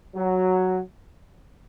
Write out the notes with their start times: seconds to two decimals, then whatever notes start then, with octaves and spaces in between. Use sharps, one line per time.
0.15 F#3